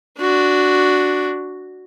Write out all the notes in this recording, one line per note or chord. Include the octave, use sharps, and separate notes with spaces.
D4 F#4